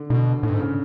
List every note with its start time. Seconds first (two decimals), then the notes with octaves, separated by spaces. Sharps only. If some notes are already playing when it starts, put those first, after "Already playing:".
Already playing: D3
0.10 B2 D3
0.43 A2 D3
0.50 G2
0.53 G#2
0.59 C#3